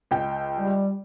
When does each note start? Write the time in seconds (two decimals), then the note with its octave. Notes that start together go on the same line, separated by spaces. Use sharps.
0.11 C#2 G5
0.58 G3